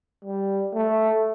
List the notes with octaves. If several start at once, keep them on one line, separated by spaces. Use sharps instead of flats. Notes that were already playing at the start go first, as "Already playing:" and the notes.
G3
A3